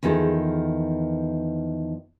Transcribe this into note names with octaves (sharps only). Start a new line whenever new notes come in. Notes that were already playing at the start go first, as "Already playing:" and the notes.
E2 D#3 F3 G#4 A4